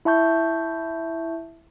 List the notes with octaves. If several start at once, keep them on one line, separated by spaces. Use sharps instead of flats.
E4 E5 A5 C#6 G6